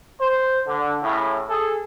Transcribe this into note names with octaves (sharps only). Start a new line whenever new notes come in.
C5
D3
A2 C#3 E4
G#4 A4